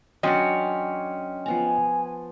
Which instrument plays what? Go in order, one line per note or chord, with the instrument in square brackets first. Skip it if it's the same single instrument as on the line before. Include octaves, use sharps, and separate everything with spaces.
[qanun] F#3 D4 D5 [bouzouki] C#4 [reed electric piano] D#5 G5 C6
[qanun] F3 B3 A#5 [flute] G#5